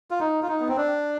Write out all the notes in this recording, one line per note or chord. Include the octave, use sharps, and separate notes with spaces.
F4
D#4
F4
D#4
B3
C4
D4